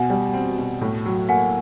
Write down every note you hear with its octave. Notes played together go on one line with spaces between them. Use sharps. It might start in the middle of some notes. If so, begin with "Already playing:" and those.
Already playing: B2 F#5 G#5
G3
C4
B2
A2
F#3
A#3 F#5 G#5